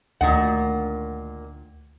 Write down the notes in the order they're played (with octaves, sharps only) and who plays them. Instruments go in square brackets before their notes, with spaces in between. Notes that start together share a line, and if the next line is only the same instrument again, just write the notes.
[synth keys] D2 [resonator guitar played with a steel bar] A#2 D#3 F#5